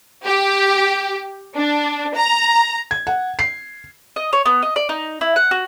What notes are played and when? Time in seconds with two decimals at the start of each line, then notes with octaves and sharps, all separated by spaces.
0.25 G4
1.55 D4
2.16 A#5
2.91 G#6
3.07 F#5
3.39 C7
4.16 D#5
4.33 C#5
4.46 B3
4.62 D#5
4.76 D5
4.89 D#4
5.21 E4
5.36 F#5
5.51 F#4